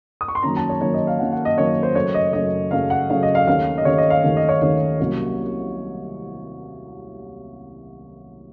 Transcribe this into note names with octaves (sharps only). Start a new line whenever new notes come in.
D#6
C#6
C6
F#2 D#3 A#3 C#4 A#5
A5
C#5
F#2 D#3 A#3 C#4 C#5
D#5
F5
F#2 D#3 A#3 C#4 F#5
F#5
D#5
F#2 D#3 A#3 C#4 C#5
C5
F#2 C#3 A3 C#5
D#5
F#2 C#3 A3 D#5
F#2 C#3 A3 F5
F#5
F#2 C#3 A3 F5
D#5
F5
D#2 D#3 A3 C#4 F5
D#5
D#2 D#3 A3 C#4 C#5
D#5
F5
D#2 D#3 A3 C#4
D#5
C#5
D#2 D#3 A3 C#4 C#5
C2 C3 F#3 A#3 C#4